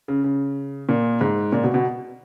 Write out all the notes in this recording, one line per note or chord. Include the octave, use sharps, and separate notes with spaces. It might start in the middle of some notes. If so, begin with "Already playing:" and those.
C#3
C#3
A#2
G#2
A#2
B2
B2